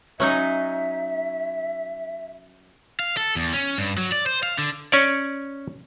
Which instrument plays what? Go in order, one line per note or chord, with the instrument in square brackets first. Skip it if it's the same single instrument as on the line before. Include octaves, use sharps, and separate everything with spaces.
[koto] F#3 C#4 D#4 [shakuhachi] E5
[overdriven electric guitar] F5
A4
E2
C#4
G2
F#3
D5
C5
F5
D3
[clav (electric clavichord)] C#4 C#5 D5